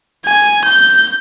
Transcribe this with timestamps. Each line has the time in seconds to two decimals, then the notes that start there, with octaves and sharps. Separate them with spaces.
0.25 G#5
0.65 G6